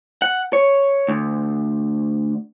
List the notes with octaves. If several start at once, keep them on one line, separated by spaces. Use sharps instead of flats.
F#5
C#5
D2